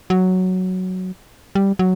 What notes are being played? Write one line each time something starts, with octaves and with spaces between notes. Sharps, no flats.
F#3
G3
F#3